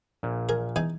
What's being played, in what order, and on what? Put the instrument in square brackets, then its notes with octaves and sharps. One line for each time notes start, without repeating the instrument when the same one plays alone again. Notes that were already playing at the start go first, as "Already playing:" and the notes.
[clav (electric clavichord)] A#1 A#2
[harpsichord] G#4 A#4
E2 D#4 G#5